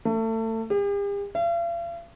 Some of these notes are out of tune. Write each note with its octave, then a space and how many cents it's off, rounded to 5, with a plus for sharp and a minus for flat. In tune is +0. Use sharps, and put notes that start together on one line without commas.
A3 +30
G4 +45
F5 -45